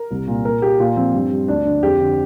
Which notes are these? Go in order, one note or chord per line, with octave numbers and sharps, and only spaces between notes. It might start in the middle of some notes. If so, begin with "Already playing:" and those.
Already playing: A#4
C2
A#2
A#2 A#4
A#3 G4
A#2 F4
F3 C4
G2
G3
D2 D4
D3
F2 G4
D3